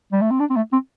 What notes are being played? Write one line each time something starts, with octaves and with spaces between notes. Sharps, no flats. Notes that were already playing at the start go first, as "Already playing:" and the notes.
G3
A3
C4
D4
C4
A3
C4